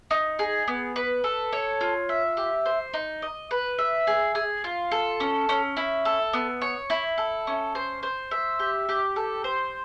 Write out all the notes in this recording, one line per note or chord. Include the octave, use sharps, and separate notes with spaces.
D#4
G#4
B3
B4
A4
C#5
F4
E5
G4
C5
D#4
D#5
B4
E5
G#4
G#4
F4
A4
C#4
C#4
E4
A4
B3
C#5
E4
A4
C#4
C5
C5
E5
G4
G4
A4
C5